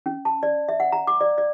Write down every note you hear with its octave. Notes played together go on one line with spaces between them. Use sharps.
C#4
A5
D5
E5
F#5
A#5
D6
D5
D5